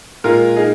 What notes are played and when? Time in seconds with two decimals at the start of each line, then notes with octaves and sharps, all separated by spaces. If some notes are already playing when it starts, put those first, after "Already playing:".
0.24 A#2 G#3 F4 A#4
0.56 D#4 G#4